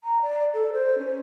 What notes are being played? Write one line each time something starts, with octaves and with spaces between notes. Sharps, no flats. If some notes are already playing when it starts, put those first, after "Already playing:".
A#5
D5
A4
C5
C#4